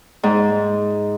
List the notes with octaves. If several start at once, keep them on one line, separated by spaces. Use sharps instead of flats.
G#2